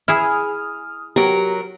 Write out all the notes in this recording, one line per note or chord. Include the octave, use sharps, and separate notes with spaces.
E4 G#4 D#6 F6
F#3 G4 A#4